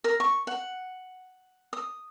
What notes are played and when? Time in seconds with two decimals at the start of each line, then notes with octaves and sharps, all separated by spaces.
0.04 A#4
0.20 C#6
0.47 F#5
1.73 D#6